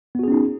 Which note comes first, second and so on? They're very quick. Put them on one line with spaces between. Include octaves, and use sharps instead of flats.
B3 F#4 G#4 C#4 D#4